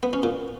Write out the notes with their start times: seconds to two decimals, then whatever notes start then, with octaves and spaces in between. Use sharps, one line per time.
0.03 B3
0.13 C#4
0.23 A#2